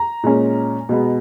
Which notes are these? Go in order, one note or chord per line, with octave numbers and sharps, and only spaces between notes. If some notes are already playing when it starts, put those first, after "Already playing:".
Already playing: A#5
A#2 G#3 C#4
B2 G#3 B3